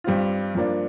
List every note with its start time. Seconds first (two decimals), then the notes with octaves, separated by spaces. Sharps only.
0.04 G2 G3 C4 F4
0.55 G2 F3 A#3 D4